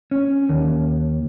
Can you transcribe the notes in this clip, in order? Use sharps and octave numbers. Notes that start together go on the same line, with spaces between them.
C#4
D#2